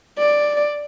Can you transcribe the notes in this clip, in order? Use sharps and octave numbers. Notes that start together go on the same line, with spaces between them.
D5